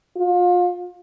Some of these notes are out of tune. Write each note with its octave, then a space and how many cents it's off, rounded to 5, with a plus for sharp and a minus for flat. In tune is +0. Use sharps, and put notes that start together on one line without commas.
F4 +30